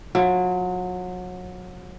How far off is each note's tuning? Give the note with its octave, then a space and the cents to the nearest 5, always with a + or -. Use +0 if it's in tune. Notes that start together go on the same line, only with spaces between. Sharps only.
F#3 -30 F4 -20